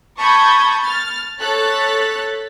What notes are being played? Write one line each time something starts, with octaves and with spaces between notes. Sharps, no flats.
A5 B5 C#6 D#6 G6 G#6
F6 A6
A4 C#5 F#6 A6 B6